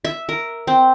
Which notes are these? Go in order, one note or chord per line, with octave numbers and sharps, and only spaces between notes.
E5
A#4
C4